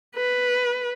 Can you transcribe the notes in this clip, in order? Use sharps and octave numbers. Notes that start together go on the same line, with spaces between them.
B4